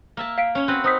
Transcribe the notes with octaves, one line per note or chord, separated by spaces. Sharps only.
A#3 E5 A5
F5 B6 D7
C#4 C#5
C4 F#4 B4
D#4 C5 D#6 B6